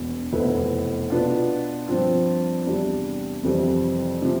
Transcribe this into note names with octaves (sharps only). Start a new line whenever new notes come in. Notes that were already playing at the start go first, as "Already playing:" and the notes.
Already playing: E1 E2 B2
F1 E2 B2 B3 E4
B2 B3 D4 F4
G2 F3 C4 F4
E2 C3 G3 D4
F2 C3 E3 G3 C4
C3 F3